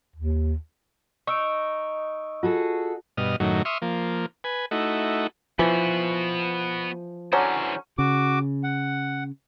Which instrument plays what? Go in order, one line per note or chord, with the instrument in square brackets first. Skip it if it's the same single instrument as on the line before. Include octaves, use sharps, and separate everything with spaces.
[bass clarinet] D#2
[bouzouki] D#4 [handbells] C#6 E6 D7
[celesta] F4 [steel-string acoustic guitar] F#4 G#4 A4
[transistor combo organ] G2 B2 D#5 F6
F#2 A2 D#3 F#3
E5 C6 C#6 D#6 F6
F3 A#3
B4 G#5
A3 D#4 E4 F#4
[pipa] E3 [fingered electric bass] F3 [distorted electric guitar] B3 F#4
[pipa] D3 F#3 C#4 [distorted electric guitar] E3 C5
[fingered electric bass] C#3 [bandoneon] F#4 D6
[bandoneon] F#5